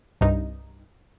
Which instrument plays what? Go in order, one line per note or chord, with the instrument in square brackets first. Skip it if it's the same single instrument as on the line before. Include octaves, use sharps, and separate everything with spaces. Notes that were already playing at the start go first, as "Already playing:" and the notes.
[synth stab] C2 G2 D#4